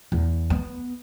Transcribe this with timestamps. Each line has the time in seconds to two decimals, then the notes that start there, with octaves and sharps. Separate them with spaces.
0.12 E2
0.50 B3